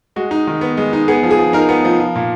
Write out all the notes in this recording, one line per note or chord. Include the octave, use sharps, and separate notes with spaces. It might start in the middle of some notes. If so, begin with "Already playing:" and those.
G#3 F#4
D#4
D#3
B3
G#3
D#4
B3 G#4
F3
G#4
F3
D#4 A#4
B3
F3
F3
A#2